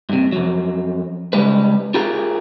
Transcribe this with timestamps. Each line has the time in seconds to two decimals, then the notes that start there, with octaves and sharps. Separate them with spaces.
0.09 G2 C3
0.32 F2 F#3
1.33 C#2 B2 G3 G#3 B4
1.94 F4 G4 G#4 A#4 F#5 A#5